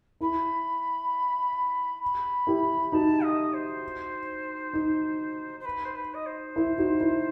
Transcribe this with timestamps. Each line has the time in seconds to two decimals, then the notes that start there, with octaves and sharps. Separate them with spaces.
0.21 E4 B5
2.02 B5
2.47 E4 G4
2.92 D#4 F#4 A5
3.23 D#5
3.53 C5
4.74 D#4
5.59 C5
5.65 B4
5.84 C5
5.95 B4
6.14 D#5
6.26 C5
6.56 E4
6.78 D#4 F#4
7.01 E4